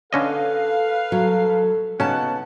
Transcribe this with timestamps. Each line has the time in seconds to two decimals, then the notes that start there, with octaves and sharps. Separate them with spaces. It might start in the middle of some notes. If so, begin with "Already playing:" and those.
0.13 D3 C#4 A4 B4 D#5 F5
1.12 F#3 A4
2.00 C#3 B3 C#4 D#4 F#4 F#5 A5